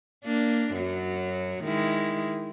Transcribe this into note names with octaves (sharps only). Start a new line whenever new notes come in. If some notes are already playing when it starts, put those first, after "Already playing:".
A#3 D4
F#2 F#3
D#3 G#3 E4